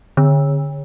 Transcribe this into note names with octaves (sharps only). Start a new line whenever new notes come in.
D3